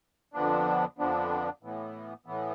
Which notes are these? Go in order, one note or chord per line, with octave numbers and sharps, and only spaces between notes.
F2 D3 F3 B3 D4
F2 D3 F3 B3 D4
A2 E3 B3
A2 E3 B3